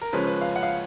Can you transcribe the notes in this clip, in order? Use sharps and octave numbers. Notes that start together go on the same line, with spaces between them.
A#4
C#3 F3 G#3 C#4 B4
B4
F5
F#5
F5